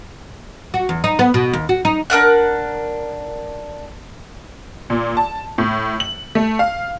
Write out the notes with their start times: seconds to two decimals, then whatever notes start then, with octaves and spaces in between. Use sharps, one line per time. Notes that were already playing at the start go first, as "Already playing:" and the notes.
0.74 F#4
0.89 E2
1.04 D#4
1.19 B3
1.34 B2
1.53 D#2
1.69 F#4
1.85 D#4
2.10 D4 A#4 F#5 F#6
4.90 A#2
5.17 A5
5.58 A2
6.00 F#7
6.35 A3
6.59 F5